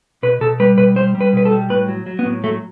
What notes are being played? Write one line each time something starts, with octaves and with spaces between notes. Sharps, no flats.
B2 B4
B2 A4
G3 B4
B2 B4
G3 C5
G3
B4
B2 B4
A4
G3
A2 B4
F#3
F#3
B3
A2
F#3 A3